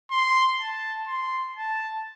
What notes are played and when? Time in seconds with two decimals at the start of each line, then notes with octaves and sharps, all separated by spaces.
0.11 C6
0.60 A5
1.07 C6
1.56 A5